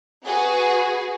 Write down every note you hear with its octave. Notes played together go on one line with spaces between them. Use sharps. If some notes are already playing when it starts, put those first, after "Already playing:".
F#4 G#4 B4